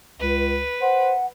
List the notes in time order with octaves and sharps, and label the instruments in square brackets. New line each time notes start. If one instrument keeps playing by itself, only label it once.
[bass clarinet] C#2 [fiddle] B4
[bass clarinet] C5 [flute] F#5